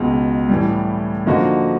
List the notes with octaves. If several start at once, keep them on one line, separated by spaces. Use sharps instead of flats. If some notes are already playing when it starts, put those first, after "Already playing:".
Already playing: C#2 B2 G#3
A2 E3 G3
D3 F3 A#3 D#4 F#4